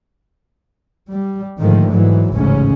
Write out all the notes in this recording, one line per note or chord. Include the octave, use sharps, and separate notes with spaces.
G3
G#2 D3 D#3 F3 A3
G#2 E3 F#3
A1 D2 G#2 C#3 C#4